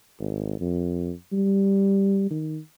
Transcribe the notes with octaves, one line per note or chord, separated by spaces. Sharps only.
G#1
F2
G3
D#3